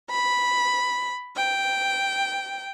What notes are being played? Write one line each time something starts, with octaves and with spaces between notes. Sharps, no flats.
B5
G5